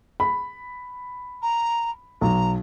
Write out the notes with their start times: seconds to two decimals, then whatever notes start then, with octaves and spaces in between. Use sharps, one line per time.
0.20 B5
1.42 A#5
2.21 B1 A#5